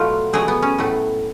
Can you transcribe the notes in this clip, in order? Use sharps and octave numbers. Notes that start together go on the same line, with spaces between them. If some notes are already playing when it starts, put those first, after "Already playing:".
Already playing: B2 F#3 A3 F4
B2 F#3 A3 G#4
B3
C#4
A2 F#3 A3